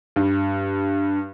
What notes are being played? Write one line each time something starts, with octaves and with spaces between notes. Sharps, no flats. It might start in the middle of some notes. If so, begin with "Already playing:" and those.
G2